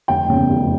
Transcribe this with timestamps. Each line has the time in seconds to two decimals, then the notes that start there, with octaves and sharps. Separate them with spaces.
0.08 F1 G5
0.29 E2 C#3
0.49 F1